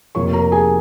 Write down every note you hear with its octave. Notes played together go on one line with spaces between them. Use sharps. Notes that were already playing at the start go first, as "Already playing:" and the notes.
F1 F2 F3 A#3 C#5 C#6
A#4 A#5
G#4 G#5